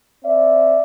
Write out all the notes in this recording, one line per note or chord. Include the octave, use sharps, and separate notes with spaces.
C4 D5 E5